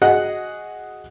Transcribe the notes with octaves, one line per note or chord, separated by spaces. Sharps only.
F#4 G#4 D#5 F#5